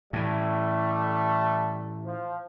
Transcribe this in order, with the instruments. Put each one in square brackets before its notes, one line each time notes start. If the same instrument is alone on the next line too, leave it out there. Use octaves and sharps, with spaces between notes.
[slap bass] A2 E3 [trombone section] G3 A3
[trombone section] F3